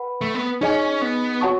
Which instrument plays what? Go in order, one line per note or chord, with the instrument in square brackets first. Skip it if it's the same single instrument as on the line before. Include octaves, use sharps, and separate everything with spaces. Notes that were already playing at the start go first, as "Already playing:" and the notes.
Already playing: [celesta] B4 F#5 B5
[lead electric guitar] A3
B3
[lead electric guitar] C#4 [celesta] D#4 G#4 D#5 G#5
[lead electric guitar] B3
[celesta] F#4 C#5 F#5 A5 C#6